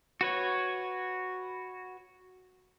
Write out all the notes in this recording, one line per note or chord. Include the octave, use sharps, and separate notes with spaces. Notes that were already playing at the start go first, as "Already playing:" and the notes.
F#4 B4 C#5